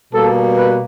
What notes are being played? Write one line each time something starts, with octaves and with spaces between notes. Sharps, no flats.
B2 G3 A#3 A4
B4